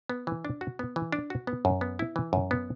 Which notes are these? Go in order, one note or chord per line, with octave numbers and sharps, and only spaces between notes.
B3
E3
D4
F#4
B3
E3
D4
F#4
B3
F#2
B3
E4
E3
F#2
B3